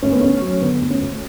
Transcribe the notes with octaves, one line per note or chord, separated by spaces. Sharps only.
D2 C#4
B3
D2 C#4
F#3
D3 B3
D2
C#4
D2